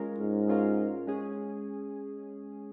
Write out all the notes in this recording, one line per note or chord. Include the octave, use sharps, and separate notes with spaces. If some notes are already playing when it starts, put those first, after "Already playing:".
Already playing: G#3 C#4 F4 A#4
G#2
G#3 C#4 F4 A#4
G#3 C#4 G#4